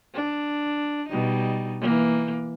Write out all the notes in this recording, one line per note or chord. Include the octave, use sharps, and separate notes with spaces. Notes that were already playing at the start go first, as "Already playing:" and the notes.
D4
B2 G3 D#4
E3 A#3